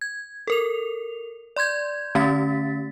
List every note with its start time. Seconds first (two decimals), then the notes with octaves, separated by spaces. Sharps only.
0.01 G#6
0.47 A4 A#4 F7
1.56 D5 C6 G6 G#6
2.15 D3 A3 C#4 A6 B6